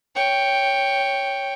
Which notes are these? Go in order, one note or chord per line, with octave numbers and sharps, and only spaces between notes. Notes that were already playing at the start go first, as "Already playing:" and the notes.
C#5 G5